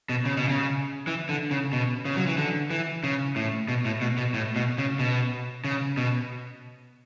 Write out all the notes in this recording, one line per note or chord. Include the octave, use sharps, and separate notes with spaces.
B2
C#3
B2
C#3
E3
D3
C#3
B2
C#3
F#3
E3
D3
E3
C#3
A2
B2
A2
B2
B2
A2
B2
C#3
B2
C#3
B2